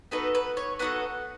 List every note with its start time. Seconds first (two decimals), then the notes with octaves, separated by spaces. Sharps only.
0.11 B3 D#4 F#4 A4 B4
0.35 B4
0.57 C#5
0.79 B3 D#4 F#4 A4 F#5